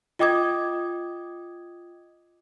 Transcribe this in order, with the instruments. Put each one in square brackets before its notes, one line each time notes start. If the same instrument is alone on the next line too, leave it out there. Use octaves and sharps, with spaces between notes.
[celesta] F4 D#5 G5 D6 D#6 G#6